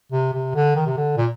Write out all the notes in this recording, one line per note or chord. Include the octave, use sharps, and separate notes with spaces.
C3
C3
D3
D#3
C3
D3
A#2